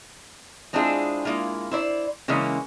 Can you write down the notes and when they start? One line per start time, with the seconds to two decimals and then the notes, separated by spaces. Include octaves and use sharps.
0.73 G#3 C4 D4 E4 F4 G#4
1.25 G#3 A#3 E4 F4
1.71 E4 C5 D5
2.28 C#3 E3 G#3 A#3 C#4